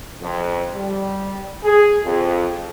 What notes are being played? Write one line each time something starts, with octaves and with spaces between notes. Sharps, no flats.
F2
G3
G#4
F2